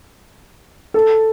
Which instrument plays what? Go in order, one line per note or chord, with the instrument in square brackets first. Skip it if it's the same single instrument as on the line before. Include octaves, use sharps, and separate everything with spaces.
[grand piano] A4